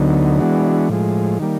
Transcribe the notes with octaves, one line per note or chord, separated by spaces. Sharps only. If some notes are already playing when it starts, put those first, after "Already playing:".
Already playing: D2 D3 F#3 B3 D#4
E3 G#3 B3 D4 F#4
A2 F3 G#3
D#3 G3 A#3